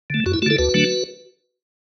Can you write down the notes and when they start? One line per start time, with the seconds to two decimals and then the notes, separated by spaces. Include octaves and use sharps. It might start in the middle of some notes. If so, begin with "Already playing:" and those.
0.10 D3 A3
0.26 F#2 F#4
0.34 E4
0.42 A3 F#4
0.46 D3 E4 A4
0.58 D2 F#4 B4
0.74 D3 F#3 A3 D4